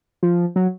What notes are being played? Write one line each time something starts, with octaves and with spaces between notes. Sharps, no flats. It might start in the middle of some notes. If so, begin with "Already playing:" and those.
F3
F#3